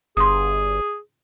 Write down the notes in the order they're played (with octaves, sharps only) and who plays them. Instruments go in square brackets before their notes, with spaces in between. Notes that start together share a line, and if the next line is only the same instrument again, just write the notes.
[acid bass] G1 [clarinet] G#4 [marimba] C6 D#6